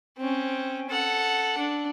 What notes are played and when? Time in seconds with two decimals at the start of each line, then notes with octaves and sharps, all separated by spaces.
0.18 C4 C#4
0.90 A4 F#5
1.58 D4